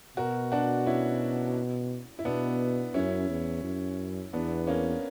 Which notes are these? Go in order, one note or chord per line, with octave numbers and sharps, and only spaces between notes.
B2 F#4 A#4
D4 F#4
C#4 E4
E4
B2 B3 D4
F#2 C#4 E4
E2
F#2
E2 B3 D4
A#3 C#4